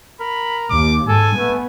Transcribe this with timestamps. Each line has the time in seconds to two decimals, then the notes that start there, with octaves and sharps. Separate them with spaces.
0.20 A#4 B5
0.70 D#2 D6
1.08 G#2 A4 G#5
1.37 A3 B3